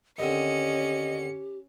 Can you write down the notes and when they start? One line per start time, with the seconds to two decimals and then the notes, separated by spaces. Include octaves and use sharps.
0.19 D#2 D3 C4 C#4 G4 D#5 C#7